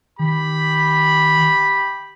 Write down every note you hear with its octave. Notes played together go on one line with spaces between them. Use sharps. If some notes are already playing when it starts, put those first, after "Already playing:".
D#3 G4 B5